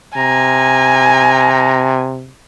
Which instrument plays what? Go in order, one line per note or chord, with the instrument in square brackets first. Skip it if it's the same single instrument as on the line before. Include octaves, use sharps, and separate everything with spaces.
[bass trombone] C3 [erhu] G#5 [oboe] A#5